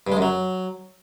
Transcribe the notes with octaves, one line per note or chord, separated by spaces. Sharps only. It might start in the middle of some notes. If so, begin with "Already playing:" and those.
G2
G#3
F#2
F#3